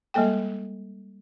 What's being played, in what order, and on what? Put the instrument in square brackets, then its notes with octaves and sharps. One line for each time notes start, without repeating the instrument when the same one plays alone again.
[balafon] G3 G#3 A#3 A4 G5